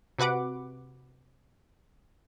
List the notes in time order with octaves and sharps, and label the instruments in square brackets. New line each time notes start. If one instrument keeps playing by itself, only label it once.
[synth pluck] C3 F#4 B4 F#5 D6